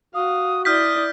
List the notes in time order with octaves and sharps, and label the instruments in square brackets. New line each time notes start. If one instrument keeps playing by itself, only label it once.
[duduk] F#4 [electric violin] F5 [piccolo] D#6
[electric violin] E4 D5 [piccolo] D#6 [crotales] F6 G6 B6